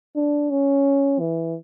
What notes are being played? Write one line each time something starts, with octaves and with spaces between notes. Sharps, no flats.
D4
C#4
E3